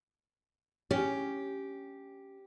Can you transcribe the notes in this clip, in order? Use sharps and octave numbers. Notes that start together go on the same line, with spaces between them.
C#4 G4